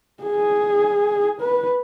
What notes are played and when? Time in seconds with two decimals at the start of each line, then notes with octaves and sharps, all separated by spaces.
0.23 G#4
1.41 B4